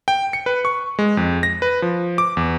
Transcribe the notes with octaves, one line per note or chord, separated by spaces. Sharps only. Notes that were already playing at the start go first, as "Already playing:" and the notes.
G5
C#7
B4
C#6
G#3
F2
A#6
B4
F3
D6
E2